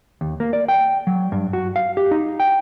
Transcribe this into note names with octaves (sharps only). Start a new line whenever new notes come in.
D#2
A#3
D5
G5
F#3
G2
F#4
F5
G4
D#4
G5